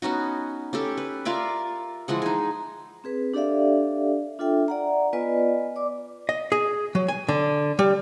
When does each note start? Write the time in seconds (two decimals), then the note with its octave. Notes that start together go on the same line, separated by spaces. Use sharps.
0.02 B3 C#4 D#4 F#4
0.73 C#4 G4 A4
0.98 B4
1.25 F4 A#4 D5 E5
2.08 E3 F3 G#3 F#5
2.22 D#4 G#4
3.04 C4 G#4 B4
3.34 D4 G4 A4 D5 E5 F5
4.39 D4 F4 A4 E5 G5
4.68 D5 F#5 A#5
5.13 B3 F4 B4 D5 D#5 G#5
5.76 D5 D6
6.29 D#5
6.52 G#4
6.95 F#3
7.08 G#5
7.29 D3
7.79 G3